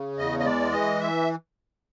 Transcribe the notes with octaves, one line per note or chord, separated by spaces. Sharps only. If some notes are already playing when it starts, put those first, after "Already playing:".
Already playing: C#3
E2 D#5
D#5
G#3 D5
E3 D#5
E5